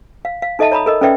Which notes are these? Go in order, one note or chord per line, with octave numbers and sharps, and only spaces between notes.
F5
F5
D#4 A4 D#5 E5 A5
C#5 A#5 B5 D#6
A4 A#4 D#5
C#4 A4 B4 D5 E5 G5